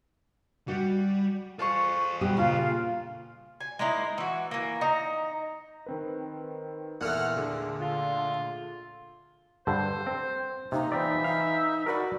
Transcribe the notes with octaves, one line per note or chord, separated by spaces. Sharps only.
G3 F#4
F4 G#4 A4 C5 C#6
B2 G3 G4 D#6
A#2 C#3 F4
G#5
G#3 A#3 D#4 E4
E3 F#4
E3 A#3
D#4 A#5
D#3 C4 B4
E2 A#2 A3 F#5 F6
D3 G#4
F4
G2 D3 C5
C4
C3 A#3 D#4
E3 C4 F4 D5 E5
D#4 F5
F#4 A#4 B4 D5 F#5